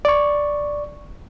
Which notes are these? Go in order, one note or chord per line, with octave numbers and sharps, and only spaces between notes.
D5 C#6